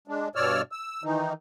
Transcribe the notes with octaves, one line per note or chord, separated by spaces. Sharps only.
G#3 D4
G2 B2 C#5 D5 E6 F6
E6
D#3 E3 D#4